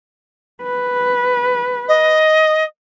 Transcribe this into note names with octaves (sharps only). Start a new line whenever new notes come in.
B4
D#5